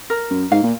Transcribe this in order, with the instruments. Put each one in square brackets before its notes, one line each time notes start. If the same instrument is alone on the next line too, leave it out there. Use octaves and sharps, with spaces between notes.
[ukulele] A#4
[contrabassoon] F#2
[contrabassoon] G#2 [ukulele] F5
[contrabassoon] A#2